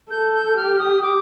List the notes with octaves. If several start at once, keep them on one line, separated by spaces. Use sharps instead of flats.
A4 G6
G6
G4 F6
D#6
D6